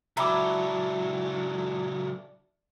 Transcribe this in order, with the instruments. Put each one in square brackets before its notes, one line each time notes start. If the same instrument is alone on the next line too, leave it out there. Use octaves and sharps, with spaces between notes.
[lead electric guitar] C#2 F#3 [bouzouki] D4 E4 G5 [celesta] A#5 B5 D6